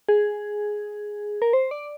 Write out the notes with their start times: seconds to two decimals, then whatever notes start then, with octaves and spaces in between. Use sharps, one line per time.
0.09 G#4
1.42 A#4
1.53 C5
1.71 D5